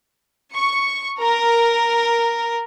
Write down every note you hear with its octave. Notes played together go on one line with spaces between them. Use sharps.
C#6
A#4